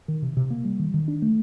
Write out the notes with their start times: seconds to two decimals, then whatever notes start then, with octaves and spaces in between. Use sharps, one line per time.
0.08 D#3
0.22 C3
0.37 C3
0.50 A#3
0.65 G3
0.79 D#3
0.94 D#3
1.08 D4
1.22 A3